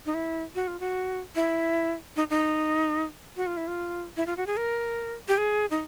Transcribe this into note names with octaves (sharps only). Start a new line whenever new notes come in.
D#4
E4
F#4
F4
F#4
E4
D#4
D#4
F#4
F4
E4
F4
E4
F4
F#4
G#4
A#4
G4
G#4
D#4